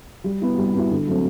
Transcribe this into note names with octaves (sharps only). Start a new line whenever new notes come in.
G3
B3 E4
G3
B3 E4
D3
F#3 A3 C4